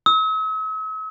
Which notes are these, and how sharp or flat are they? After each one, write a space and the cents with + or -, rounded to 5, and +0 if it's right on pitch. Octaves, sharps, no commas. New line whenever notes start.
E6 -45